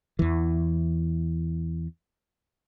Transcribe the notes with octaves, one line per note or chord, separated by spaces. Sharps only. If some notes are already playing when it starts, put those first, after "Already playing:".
E2 E3